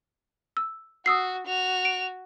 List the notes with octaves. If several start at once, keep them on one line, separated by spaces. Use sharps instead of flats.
E6
F#4 D#6 E6 C7
F#4 F7
D7